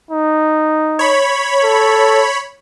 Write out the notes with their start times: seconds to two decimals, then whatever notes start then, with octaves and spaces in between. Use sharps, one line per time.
0.11 D#4
0.99 C#5 B5
1.64 A4